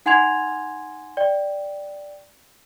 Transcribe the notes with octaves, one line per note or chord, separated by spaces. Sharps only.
D#4 F#5 G#5 C6 G#6 F7
D5 G5